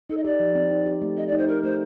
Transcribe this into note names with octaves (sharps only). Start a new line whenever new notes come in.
D#4 A4
D#5
G4 D5
F3
C4
D#4
G4
A3
C4 D#5
D5
D#4 C5
G4 A#4
A3 C5